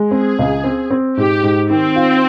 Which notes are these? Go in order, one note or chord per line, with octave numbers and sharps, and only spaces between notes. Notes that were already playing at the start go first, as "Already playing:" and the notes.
Already playing: G#3
C4 G#4
C#2
C4
C4
G#2 G4
G#2
D#3 C4
F4